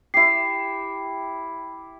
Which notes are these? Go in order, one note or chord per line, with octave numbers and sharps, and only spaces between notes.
E4 G4 C7